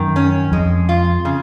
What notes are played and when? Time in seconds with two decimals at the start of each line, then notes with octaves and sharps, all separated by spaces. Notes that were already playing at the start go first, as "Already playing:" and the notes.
Already playing: F#2 D#3
0.16 C#4
0.52 F2 G#3
0.89 F4
1.25 C#3